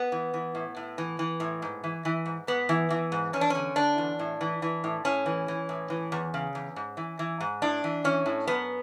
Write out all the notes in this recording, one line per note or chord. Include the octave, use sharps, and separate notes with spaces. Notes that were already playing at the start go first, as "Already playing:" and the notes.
Already playing: B3
E3
E3
A2
A2
E3
E3
A2
G#2
E3
E3
G#2
G#2 B3
E3
E3
G#2
E2 C#4
D4
D3 C#4
D3 D4
E2
A2
E3
E3
A2
A2 C#4
E3
E3
A2
E3
E2
C#3
E2
G#2
E3
E3
G#2
A2 D4
E3
E3 C#4
A2
F#2 B3